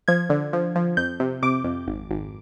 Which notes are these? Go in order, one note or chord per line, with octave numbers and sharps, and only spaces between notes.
F3 G#6
D3
F3
F3
F2 G6
C3
C3 D6
F2
G#1
G#1